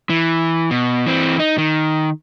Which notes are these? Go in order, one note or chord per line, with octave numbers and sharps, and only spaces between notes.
E3
B2
E3 C4
D#4
D#3